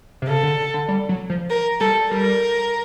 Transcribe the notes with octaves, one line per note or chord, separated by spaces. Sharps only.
C3
C#3 A4
D3
D3
G3
F#3
F3
A#4
G3 A4
G3 A#4